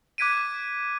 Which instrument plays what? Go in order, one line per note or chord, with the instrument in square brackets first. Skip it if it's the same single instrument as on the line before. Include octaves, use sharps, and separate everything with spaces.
[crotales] D6 F#6 G#6 B6 D7 D#7